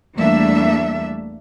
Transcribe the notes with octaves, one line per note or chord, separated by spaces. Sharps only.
E2 G3 A3 A#3 D4 E5